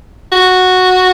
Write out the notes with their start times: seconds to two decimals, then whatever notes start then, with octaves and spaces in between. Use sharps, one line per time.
0.32 F#4